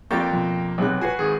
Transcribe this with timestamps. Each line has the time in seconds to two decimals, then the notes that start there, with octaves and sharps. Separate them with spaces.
0.11 F2 A#3 G4 D5 A#5 C#6 G6 A6
0.32 B2 F3
0.78 B1 C3 F#6
1.01 G1 F#4 B4 G#5 C7
1.19 G#1 D#3 G#4